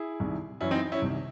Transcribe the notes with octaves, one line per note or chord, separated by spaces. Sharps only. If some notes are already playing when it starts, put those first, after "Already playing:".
Already playing: E4 G#4
C2 C3 D#3
F#2 E3 C#4 E4
C4 D#4
C#4 E4
C2 C3 D#3